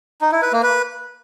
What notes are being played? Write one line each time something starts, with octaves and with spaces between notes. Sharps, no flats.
D#4
E4
B4
A#3
B4